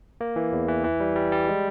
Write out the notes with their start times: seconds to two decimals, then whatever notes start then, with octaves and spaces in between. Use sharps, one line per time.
0.21 A#3
0.36 E3
0.53 E2
0.68 E3
0.84 E3
1.00 G3
1.16 G3
1.32 G3
1.48 G#3